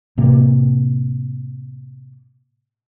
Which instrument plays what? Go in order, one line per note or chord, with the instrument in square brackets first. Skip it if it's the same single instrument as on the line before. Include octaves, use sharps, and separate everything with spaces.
[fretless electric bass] A2 C3 A#3